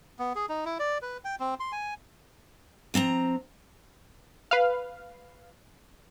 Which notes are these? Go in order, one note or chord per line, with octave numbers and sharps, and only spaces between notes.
B3
G#4
D#4
E4
D5
B4
G5
C4
C6
G#5
F3 C4 A5 A#5
B4 F5